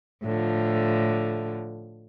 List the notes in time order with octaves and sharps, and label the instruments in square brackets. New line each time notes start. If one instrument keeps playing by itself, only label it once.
[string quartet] A2 D3 F3